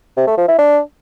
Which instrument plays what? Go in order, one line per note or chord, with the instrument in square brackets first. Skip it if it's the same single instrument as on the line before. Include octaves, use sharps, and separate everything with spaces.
[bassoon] C3
A3
F3
E4
D4